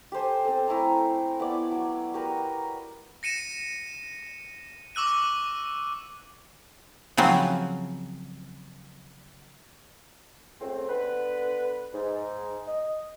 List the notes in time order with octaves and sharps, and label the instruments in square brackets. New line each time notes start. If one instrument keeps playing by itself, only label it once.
[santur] G4 A4 C5 G#5
C4 A4
A3 E4 G#5 A#5
B3 E4 C#5 D5
F#3
F#4 G4 A#4 B4
[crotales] A#6 C#7 D#7 E7
C#6 D6 E6 F#6 D#7
[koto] C#3 F3 F#3 C4
[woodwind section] C#2 A3 C4
D3 B3 B4
G#2
D#5